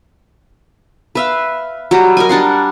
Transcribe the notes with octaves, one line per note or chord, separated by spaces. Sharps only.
B4 E5 F5
F#3 G3 F#4 G4
A#4 D#5 G#5
G3 D4 F#5 C6